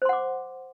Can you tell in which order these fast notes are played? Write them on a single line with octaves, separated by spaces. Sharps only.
C5 C6 F#5 D6